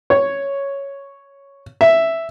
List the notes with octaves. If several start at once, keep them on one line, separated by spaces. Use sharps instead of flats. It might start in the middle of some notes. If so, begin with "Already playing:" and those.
C#5
E5